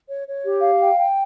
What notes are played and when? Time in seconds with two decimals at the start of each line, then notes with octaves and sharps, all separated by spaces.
0.08 C#5
0.27 C#5
0.44 G4
0.62 F5
0.80 G5
0.98 G5